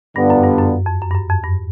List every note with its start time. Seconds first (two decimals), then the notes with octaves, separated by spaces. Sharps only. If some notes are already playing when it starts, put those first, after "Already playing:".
0.15 G2 D3 G3 B3 D4 F4
0.30 F#2
0.44 G2
0.59 F#2
0.86 F2
1.02 F#2
1.11 G2
1.15 F#2
1.30 F2
1.44 G2